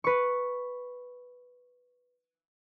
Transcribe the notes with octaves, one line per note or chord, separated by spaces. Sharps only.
B4 C#6